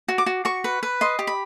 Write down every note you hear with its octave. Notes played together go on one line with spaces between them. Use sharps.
F#4
D6
F#4
F#4 C#6
B4
B4
D#5 C6
G4
B5